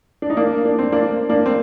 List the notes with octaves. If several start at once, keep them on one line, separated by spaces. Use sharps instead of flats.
D4
D#4
A#3 D4
D4
C4
A#3 D4
A#3 D4
C4